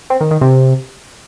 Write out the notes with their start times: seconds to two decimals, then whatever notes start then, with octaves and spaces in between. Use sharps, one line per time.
0.10 C4
0.21 D#3
0.31 D#3
0.41 C3